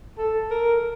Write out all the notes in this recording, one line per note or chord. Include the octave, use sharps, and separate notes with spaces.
A4
A#4